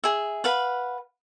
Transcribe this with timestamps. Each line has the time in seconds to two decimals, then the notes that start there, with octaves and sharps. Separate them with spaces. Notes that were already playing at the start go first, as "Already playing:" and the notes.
0.04 G#4 E5
0.44 B4 F5 F#5